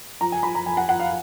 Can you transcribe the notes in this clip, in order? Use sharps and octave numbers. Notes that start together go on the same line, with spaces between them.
F3 A#5
G#5
F3 B5
A#5
F2 G#5
F#5
F3 F#5
F5